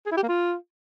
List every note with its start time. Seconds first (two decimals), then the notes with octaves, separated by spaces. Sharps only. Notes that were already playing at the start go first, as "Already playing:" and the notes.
0.06 G#4
0.12 E4
0.17 G4
0.23 A#3
0.28 F4